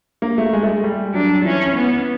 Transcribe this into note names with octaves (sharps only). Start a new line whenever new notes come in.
A#3
A3
G#3
A3
G#3
G3
F#3 D4
E3 C#4
B3